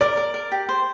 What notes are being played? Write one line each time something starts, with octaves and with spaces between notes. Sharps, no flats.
A#4 D5
A#4
A#4
G4
C5